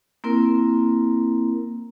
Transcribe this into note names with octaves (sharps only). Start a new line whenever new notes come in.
A#3 C4 E4 A#4